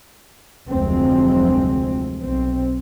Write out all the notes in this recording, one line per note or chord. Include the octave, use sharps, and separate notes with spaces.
F1 D2 F3 F#3 G#3 C4
B1 C4